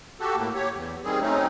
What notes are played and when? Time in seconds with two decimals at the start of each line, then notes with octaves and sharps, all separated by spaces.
0.20 F#4 G4 A4
0.36 A2 A#3
0.55 G4 C#5
0.74 E2
1.04 D#3 G3 C4 G#4
1.21 F#3 A3 C4 C#4 D#4